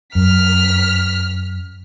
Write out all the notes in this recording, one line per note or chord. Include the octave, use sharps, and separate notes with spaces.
F#2 F6 B6